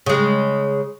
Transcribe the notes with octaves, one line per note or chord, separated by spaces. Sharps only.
C#3 G#3